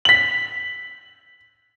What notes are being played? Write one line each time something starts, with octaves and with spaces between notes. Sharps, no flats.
B6 F#7